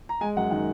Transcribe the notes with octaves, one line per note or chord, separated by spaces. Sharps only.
A#5
G#3 G#5
F#2 F#5
D#3 F#5